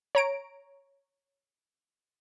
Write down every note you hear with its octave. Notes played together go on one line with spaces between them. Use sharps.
C#5 A#5 D7